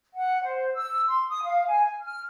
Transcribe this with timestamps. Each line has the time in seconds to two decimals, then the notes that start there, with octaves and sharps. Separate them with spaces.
0.14 F#5
0.43 C5
0.74 E6
1.08 C6
1.29 D#6
1.44 F5
1.67 G#5
2.02 F6